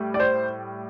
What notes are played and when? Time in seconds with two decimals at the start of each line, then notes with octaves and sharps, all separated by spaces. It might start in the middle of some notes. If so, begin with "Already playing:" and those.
Already playing: A2 G3
0.14 D5
0.20 C5